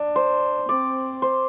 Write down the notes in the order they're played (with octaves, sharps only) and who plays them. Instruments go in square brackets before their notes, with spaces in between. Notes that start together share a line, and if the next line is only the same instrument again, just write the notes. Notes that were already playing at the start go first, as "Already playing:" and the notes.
Already playing: [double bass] D4
[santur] C5
[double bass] C4 [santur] D5
[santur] C5